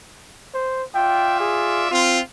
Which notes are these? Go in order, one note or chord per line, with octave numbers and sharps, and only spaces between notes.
C5
F4 D5 E5 G5
G#4
C4 F4